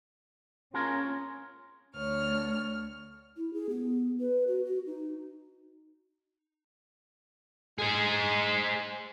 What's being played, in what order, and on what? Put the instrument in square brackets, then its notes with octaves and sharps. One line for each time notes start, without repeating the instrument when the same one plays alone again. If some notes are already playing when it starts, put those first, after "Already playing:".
[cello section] C#4 [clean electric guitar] F4 G#4 A#4 [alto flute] C6
[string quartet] D2 C#5 F6
[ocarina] E4
G#4
B3
B4
F#4
F#4
D#4
[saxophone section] G#3 [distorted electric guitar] G#4 C5